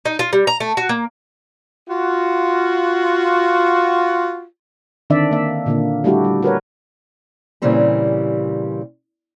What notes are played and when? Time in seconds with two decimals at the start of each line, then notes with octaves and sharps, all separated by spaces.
0.05 D#4
0.19 F4
0.33 G3
0.47 A#5
0.60 A3
0.77 F#4
0.89 A#3
1.89 F4 F#4
5.10 D3 D#3 C4 D4 D5 E5
5.31 A#3 E5
5.66 A#2 D3 A#3
6.04 G3 A3 D4 E4 F#4 G4
6.24 G3
6.43 F#4 A#4 B4 C#5
7.62 A#2 C#3 E3 G3 C4 G4